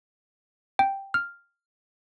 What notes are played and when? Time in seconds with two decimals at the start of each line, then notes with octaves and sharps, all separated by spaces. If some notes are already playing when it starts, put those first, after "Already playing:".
0.79 G5
1.14 F6